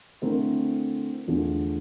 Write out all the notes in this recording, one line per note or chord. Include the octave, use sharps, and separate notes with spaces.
D3 A3 C4 E4 A#4
E2 D3 F3 A3 D4